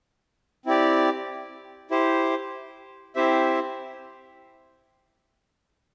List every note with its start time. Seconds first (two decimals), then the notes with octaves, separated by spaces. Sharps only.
0.65 C4 E4 G4 D5
1.91 E4 G4 C5
3.15 C4 E4 G4 C5 E5